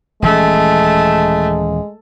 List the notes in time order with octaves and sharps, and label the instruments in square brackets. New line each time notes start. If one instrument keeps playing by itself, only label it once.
[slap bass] D#1 E3 C#4 [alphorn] G#3 [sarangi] A3